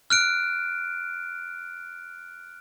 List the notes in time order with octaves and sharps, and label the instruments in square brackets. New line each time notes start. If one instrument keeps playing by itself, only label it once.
[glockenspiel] F6 F#6 D7